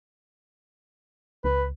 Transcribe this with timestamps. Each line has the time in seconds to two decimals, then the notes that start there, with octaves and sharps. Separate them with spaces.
1.44 C#2 B4